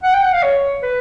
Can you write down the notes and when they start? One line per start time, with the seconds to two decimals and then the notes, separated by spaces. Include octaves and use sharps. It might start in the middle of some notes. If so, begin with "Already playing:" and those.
0.03 F#5
0.13 G5
0.23 F#5
0.33 F5
0.43 C#5
0.83 B4